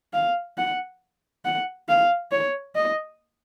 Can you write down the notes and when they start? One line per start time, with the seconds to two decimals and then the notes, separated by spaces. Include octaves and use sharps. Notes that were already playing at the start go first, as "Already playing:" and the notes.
0.13 F5
0.57 F#5
1.45 F#5
1.89 F5
2.31 C#5
2.75 D#5